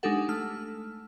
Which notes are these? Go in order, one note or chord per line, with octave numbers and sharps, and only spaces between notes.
G#3 D4 D#4 G4 A4 F#5
A3 F6